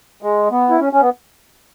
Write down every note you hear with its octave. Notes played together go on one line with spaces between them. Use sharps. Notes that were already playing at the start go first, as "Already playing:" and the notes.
G#3
B3
E4
C#4
C#4
B3